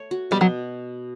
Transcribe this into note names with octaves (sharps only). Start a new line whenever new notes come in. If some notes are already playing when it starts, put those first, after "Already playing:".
Already playing: A3 C#5
F#4
B2 G3
F#3